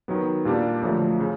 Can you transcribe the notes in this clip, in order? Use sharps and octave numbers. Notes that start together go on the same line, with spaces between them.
D#3 F#3 B3
A#2 G3 A#3 D4 G4
F#2 D3 F3 A3
C#3